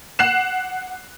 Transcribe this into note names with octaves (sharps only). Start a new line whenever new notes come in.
F#5 F#6 C7 E7